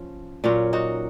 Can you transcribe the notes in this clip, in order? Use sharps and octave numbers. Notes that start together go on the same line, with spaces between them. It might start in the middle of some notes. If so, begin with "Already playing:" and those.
Already playing: F3 C#4
A#2 F#3 C#4 F4
D#4 F#4